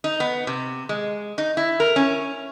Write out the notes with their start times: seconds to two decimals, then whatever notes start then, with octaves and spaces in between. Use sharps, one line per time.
0.04 D#4
0.20 B3
0.47 C3
0.89 G#3
1.38 D#4
1.57 E4
1.80 A#4
1.96 C#4